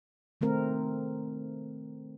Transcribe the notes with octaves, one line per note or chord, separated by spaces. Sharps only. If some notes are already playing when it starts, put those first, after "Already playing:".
D#3 A3 C4 A#4